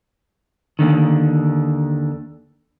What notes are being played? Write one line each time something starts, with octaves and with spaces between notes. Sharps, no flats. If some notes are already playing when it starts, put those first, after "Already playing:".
D#2 A2 D3 D#3